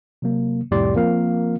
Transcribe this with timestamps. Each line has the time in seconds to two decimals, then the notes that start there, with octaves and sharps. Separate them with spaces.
0.22 C3 F#3 A#3
0.71 C2 F2 A2 G4 D5 C6
0.95 F3 A#3 C4 F4 A#4 F5